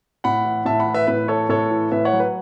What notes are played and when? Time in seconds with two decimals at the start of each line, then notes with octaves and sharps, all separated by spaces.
0.24 A2 F#5 B5
0.45 E3
0.65 A2 E5 A5
0.79 F#5 B5
0.86 E3
0.94 B4 E5
1.07 A2 B4
1.28 E3 A4 C#5
1.49 A2 A4 C#5
1.70 E3
1.91 A2 B4 E5
2.05 C#5 F#5
2.13 F#3
2.20 B4